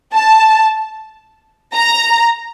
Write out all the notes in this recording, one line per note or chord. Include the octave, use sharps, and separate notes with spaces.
A5
A#5